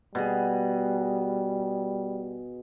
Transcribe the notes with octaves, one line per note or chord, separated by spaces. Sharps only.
B2 G3 G#4